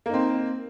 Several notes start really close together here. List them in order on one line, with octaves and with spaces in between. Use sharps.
A#3 D#4 C4